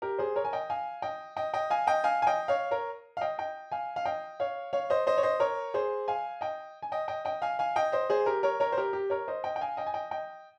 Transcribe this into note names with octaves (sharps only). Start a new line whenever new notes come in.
G4 A#4
G#4 C5
A#4 C#5
G#5
D#5 G5
F5 G#5
D#5 G5
D#5 G5
D#5 G5
F5 G#5
D#5 G5
F5 G#5
G#5
D#5 G5
C#5 F5
A#4 C#5
F5
D#5 G5
D#5 G5
F5 G#5
F5
D#5 G5
C#5 F5
C#5 F5
C5 D#5
C5 D#5
C#5
C5 D#5
A#4 C#5
G#4 C5
F5 G#5
D#5 G5
G#5
D#5 G5
D#5 G5
D#5 G5
F5 G#5
F5 G#5
D#5 G5
C5 D#5
G#4 C5
G4 A#4
A#4 C#5
A#4 C#5
C5
G4 A#4
G4
A#4 C#5
C5 D#5
D#5 G5
G5
F5 G#5
D#5 G5
G#5
D#5 G5
D#5 G5